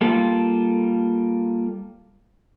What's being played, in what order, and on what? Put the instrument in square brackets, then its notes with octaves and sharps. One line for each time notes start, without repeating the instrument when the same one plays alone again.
[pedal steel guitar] G3 A#3 F4 A4